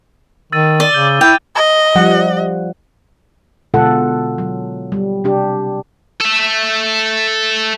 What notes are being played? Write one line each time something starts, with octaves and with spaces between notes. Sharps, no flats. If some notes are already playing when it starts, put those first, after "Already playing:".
D#3 E6 A6 D#7
D5 D6 D#7 G7
C#3 G6 D#7 G7
E4 G5 D6 G6 F7
D#5
F3 G3 F#5
B2 D3 G#3 F4 A4 F#5
F#3
G3
C3 D4 G4
A4 E5